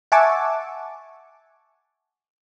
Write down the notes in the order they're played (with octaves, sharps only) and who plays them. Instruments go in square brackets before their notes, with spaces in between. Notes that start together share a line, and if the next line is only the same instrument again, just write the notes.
[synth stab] E5 F#5 G#5 A5 C#6 D6